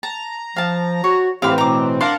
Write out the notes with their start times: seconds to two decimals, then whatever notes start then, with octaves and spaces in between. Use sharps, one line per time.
0.03 A5 A#5
0.56 F3 F5 A5
1.04 F#4 C#5
1.42 A2 E3 F#3 C4 E4 G4 F5 B5
1.58 B2 A#5 D6
2.01 D4 A#4 F5 F#5 A5 C6